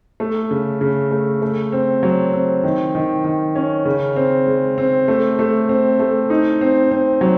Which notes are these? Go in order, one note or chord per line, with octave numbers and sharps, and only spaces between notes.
A3
C#3
C#3
A3
A3
C4
F#3
C4
D#3
D#3
D#3
C#4
C#3
C4
G#3
C4
A3
A3
C4
A3
D#4
C4
C4
F#3